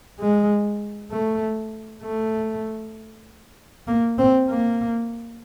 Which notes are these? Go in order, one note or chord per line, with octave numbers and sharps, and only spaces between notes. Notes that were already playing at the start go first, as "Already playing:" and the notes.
G#3
A3
A3
A#3
C4
A#3